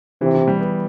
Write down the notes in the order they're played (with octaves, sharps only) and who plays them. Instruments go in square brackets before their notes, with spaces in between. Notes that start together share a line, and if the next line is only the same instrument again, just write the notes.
[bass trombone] C3 [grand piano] E3
[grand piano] E3
G3
B3